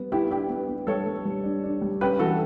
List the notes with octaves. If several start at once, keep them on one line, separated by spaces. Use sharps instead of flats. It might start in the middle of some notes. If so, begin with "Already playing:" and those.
Already playing: G3 B3
B3 E4 G4
D4 E4 G4
B3
B3
G3 A4 C#5
G3
G3
D4
D4
G3
C#4 G4 B4
E3 F#4 A4